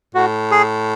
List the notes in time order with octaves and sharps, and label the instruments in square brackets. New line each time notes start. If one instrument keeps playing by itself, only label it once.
[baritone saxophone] A2 [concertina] F#4
[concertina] G#4